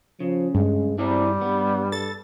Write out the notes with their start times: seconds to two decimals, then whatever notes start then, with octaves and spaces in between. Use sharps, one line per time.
0.20 C#3 F3
0.55 G2 G#3
0.98 G3 C4 E4 G#4 D5
1.41 G2 B3
1.92 A4 A6